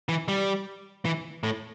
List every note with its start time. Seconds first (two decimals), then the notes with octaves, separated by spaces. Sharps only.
0.09 E3
0.28 G3
1.05 E3
1.44 A2